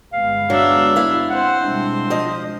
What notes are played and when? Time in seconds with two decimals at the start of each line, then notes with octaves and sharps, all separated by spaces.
0.13 G1 G#3 B3 F5
0.50 F#3 D4 E5
0.96 E4 F5
1.30 C4 C5 F#5
1.63 B2 G3 G#3 D4
2.10 F3 D#5